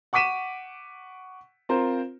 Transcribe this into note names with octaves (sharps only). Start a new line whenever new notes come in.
F#5 C#6 D6 B6 D#7 E7
C4 F4 A#4 C5